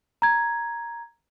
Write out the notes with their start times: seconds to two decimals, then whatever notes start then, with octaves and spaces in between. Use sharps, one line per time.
0.22 A#5 G#6